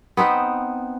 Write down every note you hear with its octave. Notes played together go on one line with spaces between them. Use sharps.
B3 C4 D#4 B4